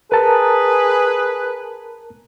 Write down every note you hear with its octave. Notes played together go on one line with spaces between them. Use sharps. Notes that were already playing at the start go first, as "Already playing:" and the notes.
G#4 A#4 B4 A5 A#5